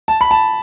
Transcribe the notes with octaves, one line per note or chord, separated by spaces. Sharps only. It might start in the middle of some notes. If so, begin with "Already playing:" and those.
A5
B5
A5